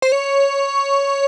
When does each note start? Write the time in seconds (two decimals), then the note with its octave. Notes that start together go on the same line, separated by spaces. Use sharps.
0.02 C5
0.12 C#5